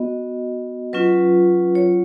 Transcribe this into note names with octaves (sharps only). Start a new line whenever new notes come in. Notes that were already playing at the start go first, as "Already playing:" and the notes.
Already playing: B3 F#4 D#5
F#3 C#4 F4 B4
C#5